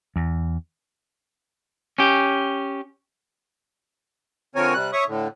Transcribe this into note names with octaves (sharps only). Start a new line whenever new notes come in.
E2
C#4 G4
D3 F3 C4 A#4 C#5 G#5
C3 G3 F#6
C#5 E5 C#6 D#6
A2 D3